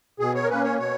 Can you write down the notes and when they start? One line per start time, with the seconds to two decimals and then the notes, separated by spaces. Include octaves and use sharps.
0.20 B2 G#4
0.34 C#5
0.43 A#4
0.49 A#3 C#4 B4
0.64 C#5
0.78 B2 C#5